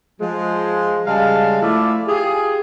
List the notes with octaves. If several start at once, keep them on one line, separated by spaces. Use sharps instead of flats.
F3 G#3
C#3 G3 G#3 F5 A5
F3 A3 E4 F4 D5
F4 G4 G#4